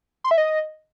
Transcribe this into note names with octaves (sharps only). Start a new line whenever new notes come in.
C6
E5
D#5